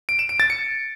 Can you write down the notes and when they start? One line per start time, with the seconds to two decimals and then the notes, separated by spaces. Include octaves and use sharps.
0.09 D7
0.19 E7
0.29 D7
0.40 A6
0.50 C#7